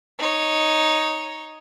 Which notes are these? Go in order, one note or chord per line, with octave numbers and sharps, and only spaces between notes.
D#4 C#5